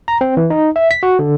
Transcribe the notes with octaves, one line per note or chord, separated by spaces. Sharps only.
A#5
C4
E3
D#4
E5
B6
F#4
D3